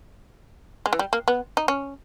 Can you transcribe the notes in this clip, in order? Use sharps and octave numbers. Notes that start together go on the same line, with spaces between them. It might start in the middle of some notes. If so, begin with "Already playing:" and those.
G#3
E3
G3
A#3
B3
D#4
C#4